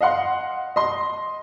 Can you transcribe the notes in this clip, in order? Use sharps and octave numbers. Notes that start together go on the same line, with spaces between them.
D#5 F5 F#5 C6
D#5 C6